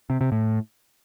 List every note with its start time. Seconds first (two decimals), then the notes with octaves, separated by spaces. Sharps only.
0.10 C3
0.21 C3
0.32 A2